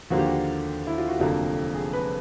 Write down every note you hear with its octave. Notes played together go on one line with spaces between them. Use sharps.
D#2 D3 F3 A#3 F#4
G4
F#4
E4
F4
F#4
F1 F2 D3 F#3 A#3 G4
G#4
B4